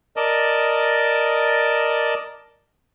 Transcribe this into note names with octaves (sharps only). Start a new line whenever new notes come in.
A#4 D5 D#5 A5